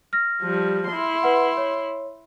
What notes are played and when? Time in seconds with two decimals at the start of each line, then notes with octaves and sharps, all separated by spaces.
0.13 F6 A#6
0.42 F3 G3
0.88 E4 C6
1.23 B4 F#5
1.57 C#5